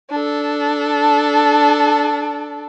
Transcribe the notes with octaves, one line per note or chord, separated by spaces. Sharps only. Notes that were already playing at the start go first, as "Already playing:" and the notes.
D4 A4